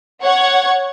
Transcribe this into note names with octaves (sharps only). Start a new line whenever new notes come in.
C#5 F#5 G#6